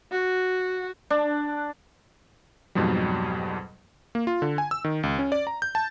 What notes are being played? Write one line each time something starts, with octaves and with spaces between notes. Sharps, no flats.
F#4
D4
F2 G#2 B2 F#3 G3
A#3
F4
D3
G#5
E6
D#3
C#2
C#4
D5
A#5
G6
A5